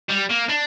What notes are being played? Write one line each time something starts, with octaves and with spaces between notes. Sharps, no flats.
G3
A#3
D4